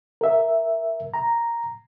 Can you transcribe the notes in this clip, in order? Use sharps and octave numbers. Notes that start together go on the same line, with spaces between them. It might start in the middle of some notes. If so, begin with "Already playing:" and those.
A#4 E5
A#5